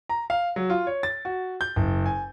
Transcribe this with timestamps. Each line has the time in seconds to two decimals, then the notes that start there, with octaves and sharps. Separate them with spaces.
0.09 A#5
0.30 F5
0.56 F#3
0.70 F4
0.87 C#5
1.03 A6
1.25 F#4
1.61 G6
1.76 F#1
2.06 G#5